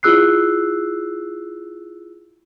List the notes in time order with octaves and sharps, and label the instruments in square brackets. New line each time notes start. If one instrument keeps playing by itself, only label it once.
[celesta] E4 F4 G#4 E6 F#6 C7